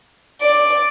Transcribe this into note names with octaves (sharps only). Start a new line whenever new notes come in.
D5